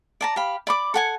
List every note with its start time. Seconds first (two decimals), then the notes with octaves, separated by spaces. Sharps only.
0.21 D5 A5 A#5
0.36 G4 F5 B5
0.67 D5 B5 D6
0.94 A4 F#5 G#5